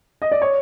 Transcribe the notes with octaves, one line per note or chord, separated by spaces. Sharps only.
D#5
D5
C#5